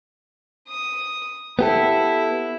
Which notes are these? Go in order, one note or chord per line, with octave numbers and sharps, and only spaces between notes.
D#6
B3 E4 G4 A4